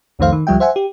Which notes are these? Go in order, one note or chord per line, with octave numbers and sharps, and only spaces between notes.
C2 F2 D#3 A3 C5 F5
D#3
C#2 F3 G3 E5 G5
C5 E5 F#5 G#5
G4